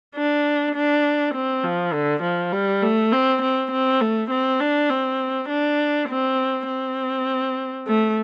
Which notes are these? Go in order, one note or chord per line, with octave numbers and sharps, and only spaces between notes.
D4
D4
C4
F3
D3
F3
G3
A3
C4
C4
C4
A3
C4
D4
C4
D4
C4
C4
A3